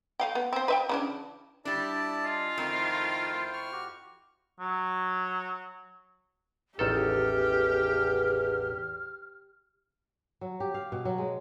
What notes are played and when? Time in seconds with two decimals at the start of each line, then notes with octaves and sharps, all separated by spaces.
0.20 A3 F5 G5
0.35 B3
0.53 C4 C5
0.68 B4 E5 G5
0.89 C#3 E3 D4
1.65 G3 D4 E4 D5 A5
2.25 F4 D#5 G#5
2.58 F2 D#3 A3 E4 A#4 C5 G5
3.53 C#6 F6
3.72 F#4 G4
4.60 F#3
6.79 A1 E2 D#3 G4 A4 F6
10.41 F#3
10.60 G4
10.74 F5
10.92 B2
11.05 F#3
11.18 G#3